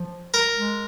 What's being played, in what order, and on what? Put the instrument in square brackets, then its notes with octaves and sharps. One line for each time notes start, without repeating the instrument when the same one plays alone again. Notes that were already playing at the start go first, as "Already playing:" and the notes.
Already playing: [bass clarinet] F3
[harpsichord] A#4
[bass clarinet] G#3